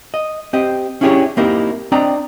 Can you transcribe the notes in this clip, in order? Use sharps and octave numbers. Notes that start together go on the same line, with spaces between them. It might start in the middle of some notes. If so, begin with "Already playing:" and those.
D#5
C4 G4 D#5
C#4 D4 E4 G4 G#4 C#5
A#3 C4 D#4 E4 G4 A#4
C4 D4 D5 D#5 G5 A#5